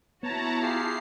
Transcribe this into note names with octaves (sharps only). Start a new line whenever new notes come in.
B3 E4 F#4 C#5 A5 A#5
F4 G4 G#4 C7